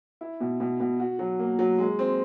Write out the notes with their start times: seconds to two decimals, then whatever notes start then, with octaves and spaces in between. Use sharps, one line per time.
0.21 E4
0.40 B2
0.60 B2
0.80 B2
1.00 F#4
1.19 F#3
1.39 A#3
1.59 F#3
1.78 G#3
1.99 C4